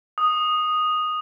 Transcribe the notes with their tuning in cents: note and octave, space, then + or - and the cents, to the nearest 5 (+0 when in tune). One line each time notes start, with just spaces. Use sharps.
D#6 -5